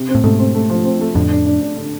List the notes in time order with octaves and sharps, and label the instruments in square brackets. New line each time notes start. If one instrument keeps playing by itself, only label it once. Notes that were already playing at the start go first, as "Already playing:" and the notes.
Already playing: [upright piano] C3
C4
[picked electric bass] A2
[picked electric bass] G#2 B2 [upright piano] A3
[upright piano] C4
A3
F3
C4
A3
[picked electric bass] F2 A2 [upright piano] D3
[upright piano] D4
D4
D4
D3